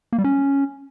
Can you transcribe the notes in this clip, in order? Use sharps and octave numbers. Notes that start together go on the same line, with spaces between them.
A#3
G3
C#4